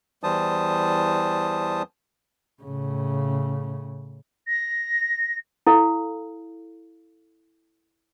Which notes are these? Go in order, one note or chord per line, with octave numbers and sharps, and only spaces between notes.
E2 E3 G3 C5 A5 D#6
A2 C#3
A#6
E4 A4 F5